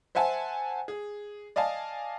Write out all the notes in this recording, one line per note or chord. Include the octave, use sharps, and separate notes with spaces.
C5 E5 F#5 G#5 A5
G#4
D5 D#5 F5 G#5 A5